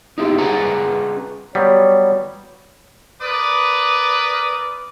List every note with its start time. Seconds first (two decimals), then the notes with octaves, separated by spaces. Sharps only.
0.18 D#4 E4 G4
0.38 C#4 G#4 B4 F#5 A5 A#5
1.55 F#3 G3 B3 C#5
3.21 A#4 B4 D5 D6 D#6